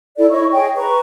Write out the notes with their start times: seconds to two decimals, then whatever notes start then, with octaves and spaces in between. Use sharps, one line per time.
0.17 E4 A4 D5
0.31 E4 C#5 D#5 C#6
0.51 G#4 C#5 D#5 G5
0.76 B4 A#5 C#6